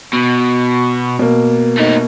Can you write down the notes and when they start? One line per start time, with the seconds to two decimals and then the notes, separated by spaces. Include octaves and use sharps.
0.13 B2
1.19 B2 A#3
1.77 A3 D#4